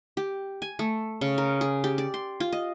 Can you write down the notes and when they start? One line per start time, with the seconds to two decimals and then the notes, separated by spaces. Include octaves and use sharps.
0.17 G4
0.62 G#5
0.79 A3
1.21 C#3
1.38 A#4
1.61 G#4
1.84 G4
1.98 D5
2.14 C6
2.40 F4
2.53 D#5